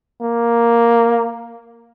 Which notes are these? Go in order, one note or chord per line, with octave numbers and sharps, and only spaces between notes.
A#3